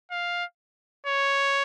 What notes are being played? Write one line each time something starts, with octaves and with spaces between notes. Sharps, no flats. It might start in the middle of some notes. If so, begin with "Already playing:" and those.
F5
C#5